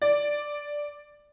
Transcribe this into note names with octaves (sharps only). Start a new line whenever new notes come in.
D5